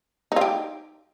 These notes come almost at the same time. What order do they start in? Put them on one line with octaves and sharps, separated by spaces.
D#4 F4 G4